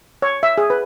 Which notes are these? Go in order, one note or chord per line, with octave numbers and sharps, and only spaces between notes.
C#5
E5
G#4
B4